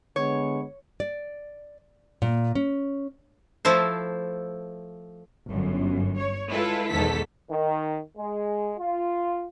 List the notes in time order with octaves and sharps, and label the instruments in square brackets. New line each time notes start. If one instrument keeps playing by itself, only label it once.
[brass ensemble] D3 G#3 B3 [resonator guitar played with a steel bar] C#5
[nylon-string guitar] D5
A#2
C#4
[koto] F3 A3 E4 C5
[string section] G1 F#2
C#5
G#3 E4 F4 A4 B4
B1 E2 G#2 D#3 A4 B6
[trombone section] D#3
G#3
F4